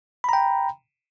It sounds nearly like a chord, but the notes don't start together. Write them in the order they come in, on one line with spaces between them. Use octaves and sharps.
B5 A#5 G5